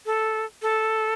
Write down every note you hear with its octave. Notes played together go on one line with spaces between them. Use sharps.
A4
A4